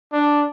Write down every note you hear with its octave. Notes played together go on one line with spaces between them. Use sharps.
D4